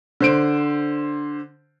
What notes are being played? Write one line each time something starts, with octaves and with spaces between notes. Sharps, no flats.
D3 C5 D7